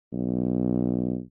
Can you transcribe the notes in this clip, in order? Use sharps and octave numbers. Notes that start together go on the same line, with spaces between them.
B1